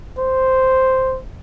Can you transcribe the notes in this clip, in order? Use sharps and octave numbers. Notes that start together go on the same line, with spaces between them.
C5